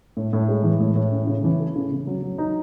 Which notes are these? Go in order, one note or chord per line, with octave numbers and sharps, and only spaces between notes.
A2
A2
G#3
E3
A2
A2
C#4
C#3
E3
A3
C#3
C#3
F#3
F#3
D#4